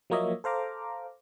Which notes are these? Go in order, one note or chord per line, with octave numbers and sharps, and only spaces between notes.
F3 F#3 A#3 C#5 D#5 E5
A4 C5 F5 A#5 D6